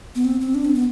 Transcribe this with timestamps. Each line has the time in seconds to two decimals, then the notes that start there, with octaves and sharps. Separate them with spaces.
0.15 B3
0.25 C4
0.41 C4
0.55 D4
0.65 C4
0.75 B3